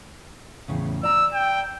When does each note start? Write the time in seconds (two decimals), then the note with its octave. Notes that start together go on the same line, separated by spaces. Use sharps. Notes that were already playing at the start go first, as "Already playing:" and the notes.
0.68 E2 A2 C#3
1.03 D5 A#5 E6
1.34 G5